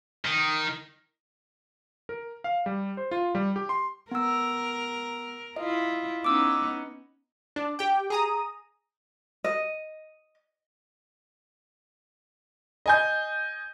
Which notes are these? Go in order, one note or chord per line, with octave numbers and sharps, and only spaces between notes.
D#3
A#4
F5
G3
C5
F4
G3
G4
C6
B3 A#4 E6
E4 F4 D#5
B3 C#4 D#4 D6 E6
D4
G4 G5
G#4 A#5 D#6
D#5
D#5 G#5 G6